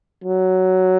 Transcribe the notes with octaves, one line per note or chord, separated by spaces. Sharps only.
F#3